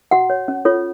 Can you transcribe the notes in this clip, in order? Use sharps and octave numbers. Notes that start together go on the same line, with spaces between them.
F#4 F#5
C#5
C#4
F4 A4 C#5